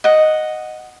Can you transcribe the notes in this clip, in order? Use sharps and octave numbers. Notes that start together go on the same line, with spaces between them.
D#5 F#5